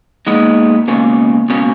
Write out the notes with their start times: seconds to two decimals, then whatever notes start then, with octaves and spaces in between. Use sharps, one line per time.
0.27 A#2 G#3 B3 D#4
0.88 C#2 B2 A#3 C#4
1.49 C#2 B2 A#3 C#4